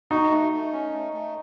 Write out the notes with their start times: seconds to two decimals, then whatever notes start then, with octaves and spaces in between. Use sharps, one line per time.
0.11 D#4 F#4
0.31 A3
0.52 A3
0.72 C#4
0.93 A3
1.13 A3